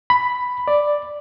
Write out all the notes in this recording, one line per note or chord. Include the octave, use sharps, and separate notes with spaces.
B5
D5